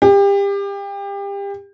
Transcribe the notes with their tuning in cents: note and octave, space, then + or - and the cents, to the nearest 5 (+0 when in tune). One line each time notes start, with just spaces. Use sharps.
G4 +30